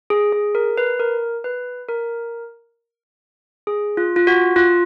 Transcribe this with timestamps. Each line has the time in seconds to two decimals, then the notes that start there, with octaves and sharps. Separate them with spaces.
0.10 G#4
0.33 G#4
0.55 A#4
0.78 B4
1.00 A#4
1.44 B4
1.88 A#4
3.67 G#4
3.97 F4
4.16 F4
4.27 F#4
4.56 F4